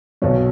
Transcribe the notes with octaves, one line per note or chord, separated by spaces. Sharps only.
B1 B2 F#3 C#5